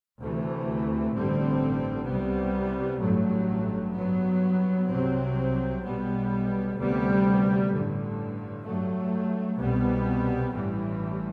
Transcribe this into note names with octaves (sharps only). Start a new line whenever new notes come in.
D2 C3 E3 A3
A1 G2 D3 G3 C4
C2 C3 G3 B3
A1 G2 F#3 A3
G2 F#3 B3
C2 C3 F#3 C4
B1 B2 G3 B3
D2 C3 G3 B3
A1 G2 D3
G2 F#3 A3
C2 B2 G3 B3
A1 G2 E3 G3